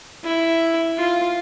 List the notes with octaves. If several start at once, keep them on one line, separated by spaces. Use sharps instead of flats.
E4
F4